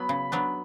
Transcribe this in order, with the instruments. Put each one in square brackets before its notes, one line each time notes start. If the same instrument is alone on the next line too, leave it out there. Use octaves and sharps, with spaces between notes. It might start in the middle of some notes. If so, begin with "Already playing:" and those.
Already playing: [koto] F#3 B3 [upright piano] B5
[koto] C#3
F#3 B3 D4